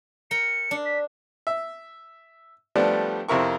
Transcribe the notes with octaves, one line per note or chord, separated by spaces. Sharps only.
A#4 G5 C#7
D4
B6
E5
F3 G3 A3 B3 D4
F2 C3 E4 A#4 C#6